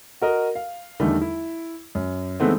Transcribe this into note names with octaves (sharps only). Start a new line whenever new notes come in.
F#4 A#4 D#5
F5
E2 D3 D#3 G3 A3
E4
F#2
D#3 E3 G#3 A3 B3 C4